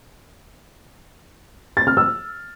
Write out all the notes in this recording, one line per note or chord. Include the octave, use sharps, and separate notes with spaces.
A6
F6
E6